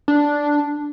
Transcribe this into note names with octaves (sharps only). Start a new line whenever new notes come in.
D4